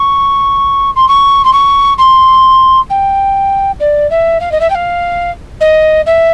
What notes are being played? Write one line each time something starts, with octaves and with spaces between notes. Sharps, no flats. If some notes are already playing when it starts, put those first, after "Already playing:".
Already playing: C#6
C6
C#6
C6
C#6
C6
G5
D5
E5
F5
D#5
E5
G5
F5
D#5
E5